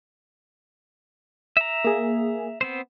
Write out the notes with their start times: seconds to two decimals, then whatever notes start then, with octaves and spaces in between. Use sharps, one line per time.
1.57 E5 A#5
1.84 A#3 G#4
2.61 B3 C4 C5